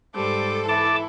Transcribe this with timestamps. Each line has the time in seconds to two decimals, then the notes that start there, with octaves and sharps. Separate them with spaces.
0.16 G#2 G3 A4 C5 D6
0.68 E3 E4 A5 D6